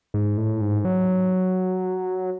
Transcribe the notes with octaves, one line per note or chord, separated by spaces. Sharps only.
G#2
A2
G#2
F#3